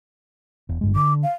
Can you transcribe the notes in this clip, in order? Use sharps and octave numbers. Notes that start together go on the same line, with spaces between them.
E1
G1 G2 G#3
D3 D6
F5